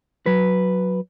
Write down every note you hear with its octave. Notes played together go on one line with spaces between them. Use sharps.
F#3 B4